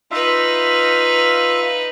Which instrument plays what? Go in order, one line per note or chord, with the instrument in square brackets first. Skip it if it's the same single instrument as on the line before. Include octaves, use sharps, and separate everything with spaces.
[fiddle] D#4 B4 [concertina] F4 E5 F5